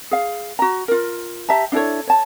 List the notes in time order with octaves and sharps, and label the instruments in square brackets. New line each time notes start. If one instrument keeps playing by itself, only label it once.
[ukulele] G#4 F5
F#4 A#5
F4 A#4
G4 E5 A5 A#5
D4 E4 A4 C#5
C#5 A5